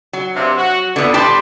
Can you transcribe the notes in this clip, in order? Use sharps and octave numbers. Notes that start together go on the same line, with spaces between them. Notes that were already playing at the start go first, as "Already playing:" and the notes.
F#3
G2 C3
F#4
F2 D3 E3 B3
A2 G3 G4 B4 C5 A5